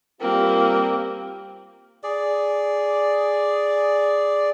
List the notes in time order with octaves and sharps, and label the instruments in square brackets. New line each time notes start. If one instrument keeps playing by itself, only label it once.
[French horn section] G3 F4 [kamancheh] A#3 C4
[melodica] G#4 D5